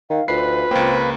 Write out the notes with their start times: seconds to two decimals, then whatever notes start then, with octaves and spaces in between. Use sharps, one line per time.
0.10 D#3 F5
0.28 D2 F4 B4 C7
0.71 C#2 A#3 C4